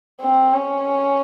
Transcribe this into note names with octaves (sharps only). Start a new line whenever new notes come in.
C4
C#4